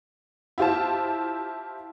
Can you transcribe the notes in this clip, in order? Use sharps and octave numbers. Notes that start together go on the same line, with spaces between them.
E4 F4 G4 C5 A5